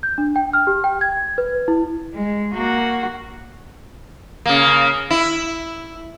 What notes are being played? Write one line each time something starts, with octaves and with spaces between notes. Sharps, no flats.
G6
D4
G5
F6
G4
G5
G#6
B4
E4
G#3
A#3 F#4
C#3 A#3
E4